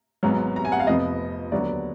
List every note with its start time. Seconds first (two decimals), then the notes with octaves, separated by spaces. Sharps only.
0.23 G#1 G#2 F#3 B3
0.56 A#5
0.65 G#5
0.72 F#5
0.80 F5
0.87 F1 F2 F3 B3 D#5
1.52 D#2 D3 F#3 B3 D4 D5